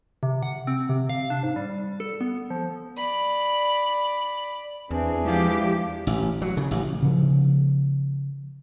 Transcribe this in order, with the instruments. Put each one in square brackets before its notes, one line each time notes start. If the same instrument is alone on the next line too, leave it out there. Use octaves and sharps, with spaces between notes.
[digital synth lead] C3
F#5
C4
C3
F5
D4
G#2
G3
A4
B3
F3
[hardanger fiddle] D5 B5
[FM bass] E2 [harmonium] E3 D4 G#4 [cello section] C4
[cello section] F3 G4 [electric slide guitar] G#3 E4 F5
[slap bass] A1
F#3
C#3
A1
[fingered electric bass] C#3 F3